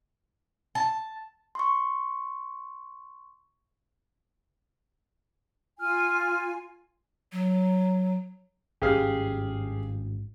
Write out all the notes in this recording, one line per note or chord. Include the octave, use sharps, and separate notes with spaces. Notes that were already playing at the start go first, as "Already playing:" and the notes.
A5
C6 C#6
F4 G#5 F6
F#3
G#1 G2 C#4 G4 G#4 F5